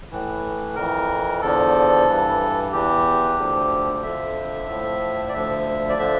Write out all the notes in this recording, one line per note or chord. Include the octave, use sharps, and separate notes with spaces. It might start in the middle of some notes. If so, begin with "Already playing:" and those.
A2 E3
F2 E3 A#4
E2 D3 F3 A4
G2 E3
E2 E3 G4
D2 D3 F3
F2 D3 F3 E5
A2 F3
D5
D2 D3 F3 E5
D5
D3 F3 E5